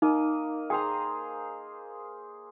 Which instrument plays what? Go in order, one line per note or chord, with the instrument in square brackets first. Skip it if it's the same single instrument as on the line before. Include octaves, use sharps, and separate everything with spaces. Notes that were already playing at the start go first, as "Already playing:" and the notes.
[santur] A#3 D#5 [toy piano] D#4
[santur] G#4 C5 A#5 [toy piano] G5